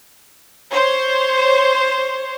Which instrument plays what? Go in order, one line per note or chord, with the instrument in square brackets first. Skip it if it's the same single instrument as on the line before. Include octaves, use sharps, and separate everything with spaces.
[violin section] C5 C#5